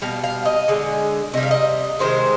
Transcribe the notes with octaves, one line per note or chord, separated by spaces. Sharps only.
B2 G3 F5
F5
D#5
D3 G#3
C3 G3 D#5
F5
D#5
C3 D#3 G#3 C5